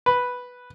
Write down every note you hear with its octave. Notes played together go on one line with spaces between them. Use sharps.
B4